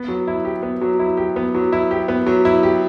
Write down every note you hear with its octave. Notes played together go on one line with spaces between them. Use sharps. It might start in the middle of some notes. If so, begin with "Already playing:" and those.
Already playing: B3
F#3
E4
G4
B3
F#3
E4
G4
B3
F#3
E4
G4
B3
F#3
E4
G4